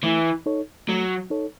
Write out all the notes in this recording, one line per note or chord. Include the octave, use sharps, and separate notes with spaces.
E3 A3
D#4 A4 C#5
F#3 A3
D#4 A4 C#5